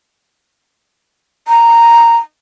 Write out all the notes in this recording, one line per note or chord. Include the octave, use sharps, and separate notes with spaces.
A#5